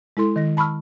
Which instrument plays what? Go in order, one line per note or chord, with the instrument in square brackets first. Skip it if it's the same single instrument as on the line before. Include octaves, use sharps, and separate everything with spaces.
[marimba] G#3 E4 A4 C6
D#3 A#6
A5 B5 C#6 E6 F6